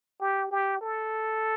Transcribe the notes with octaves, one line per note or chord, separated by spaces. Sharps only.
G4
G4
A4